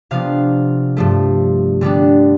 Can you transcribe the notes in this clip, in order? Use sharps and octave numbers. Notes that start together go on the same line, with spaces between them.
C3 F3 B3 D4 F5
G2 F3 A3
D3 G3 B3 D4